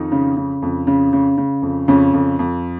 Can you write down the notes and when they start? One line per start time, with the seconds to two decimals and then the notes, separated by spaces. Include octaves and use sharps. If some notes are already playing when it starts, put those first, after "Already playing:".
Already playing: F2 D#3 D#4
0.12 C#3
0.37 C#3
0.62 F2
0.87 C#3
1.13 C#3
1.37 C#3
1.62 F2
1.88 F2 C#3 C#4
2.13 F2
2.39 F2